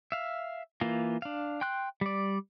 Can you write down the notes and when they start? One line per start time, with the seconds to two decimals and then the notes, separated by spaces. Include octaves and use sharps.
0.12 E5 F5
0.81 E3 A#3 F4
1.22 D4 F5
1.61 G5 C6 F#6
2.01 G3 D5